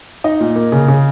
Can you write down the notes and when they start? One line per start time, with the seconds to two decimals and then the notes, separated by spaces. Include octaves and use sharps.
0.24 D#4 D#5
0.40 A#2
0.56 A#3
0.72 C#3
0.88 C#3